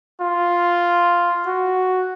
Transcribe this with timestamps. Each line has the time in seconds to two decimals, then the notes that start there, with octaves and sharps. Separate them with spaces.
0.21 F4
1.46 F#4